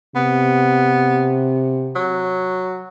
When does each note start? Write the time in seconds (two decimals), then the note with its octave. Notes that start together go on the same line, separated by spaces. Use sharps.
0.16 C3 B3
1.95 F#3